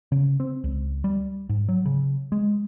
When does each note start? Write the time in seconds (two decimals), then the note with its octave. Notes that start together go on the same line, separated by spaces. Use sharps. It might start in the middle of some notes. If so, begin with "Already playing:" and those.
0.12 C#3
0.40 C4
0.64 C#2
1.04 G3
1.49 G#2
1.69 F#3
1.86 C#3
2.32 G#3